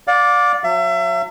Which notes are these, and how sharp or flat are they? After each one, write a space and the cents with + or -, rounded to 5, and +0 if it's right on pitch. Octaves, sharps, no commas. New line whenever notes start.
D5 -5 F5 +40
F#3 -30 E5 +35